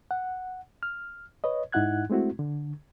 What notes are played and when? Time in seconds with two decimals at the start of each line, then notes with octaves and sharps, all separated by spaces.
0.11 F#5
0.83 F6
1.44 B4 C#5 D#5
1.72 G#2 D#4 E4 F#5 F#6 G#6
2.10 G#3 A3 C4 E4 F#4
2.39 D3